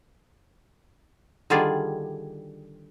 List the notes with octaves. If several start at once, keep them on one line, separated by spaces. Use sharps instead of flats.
D3 D#3 G3 F4 G#4 D5